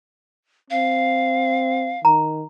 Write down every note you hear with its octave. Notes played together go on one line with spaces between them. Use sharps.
C4 F5
D#3 A#5